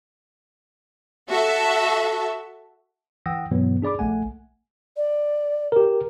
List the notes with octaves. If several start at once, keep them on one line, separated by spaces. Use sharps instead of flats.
F#4 A4 E5
E3 F#5 G5 D#6 E6 A#6
G2 B2 E3 F#3 B3
D4 G#4 D5 B5 D6
A#1 A3 F#5 G#5
D5
G4 A#4